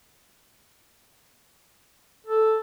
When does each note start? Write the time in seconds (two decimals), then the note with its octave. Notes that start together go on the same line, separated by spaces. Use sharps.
2.27 A4